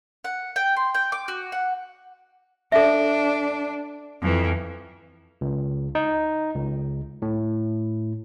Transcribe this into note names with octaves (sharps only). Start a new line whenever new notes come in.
F#5
G5
C6
G5
D6
F#4
F#5
D4 A4 E5
F2 E3
C#2
D#4
C#2
A2